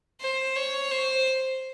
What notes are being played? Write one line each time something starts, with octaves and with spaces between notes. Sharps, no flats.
C5
C#5
C5